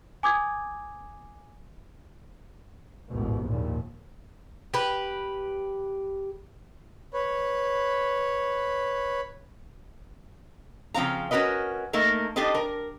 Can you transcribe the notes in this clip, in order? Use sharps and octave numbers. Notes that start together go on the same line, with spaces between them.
G#5 D6 D#6 G#6
A1 D#2 G#2 B2
A#1 D#2 A#2
G4 B4
B4 C#5
C#3 F3 C4 F5 A#5
C#4 F#4 A#4 B4 D#5
A3 A#3 D#4 A#4
D4 D#4 G4 A4 C5 D#5
A#4